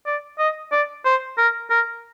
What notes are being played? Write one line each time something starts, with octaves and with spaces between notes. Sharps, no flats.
D5
D#5
D5
C5
A#4
A#4